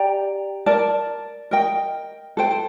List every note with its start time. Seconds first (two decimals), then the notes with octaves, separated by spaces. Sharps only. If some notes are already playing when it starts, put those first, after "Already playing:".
Already playing: G4 D5 G5 A#5
0.66 A#4 D5 A5
1.51 A#4 D#5 G5
2.37 A4 C5 G5